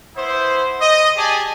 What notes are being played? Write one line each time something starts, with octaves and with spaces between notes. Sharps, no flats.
B3 E4 C5
D#5
G4 G#4 D5 G#5 A5